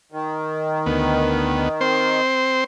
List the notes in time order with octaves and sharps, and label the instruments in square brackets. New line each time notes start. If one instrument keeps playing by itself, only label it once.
[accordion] D#3
[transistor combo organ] D2 B3
C4 C5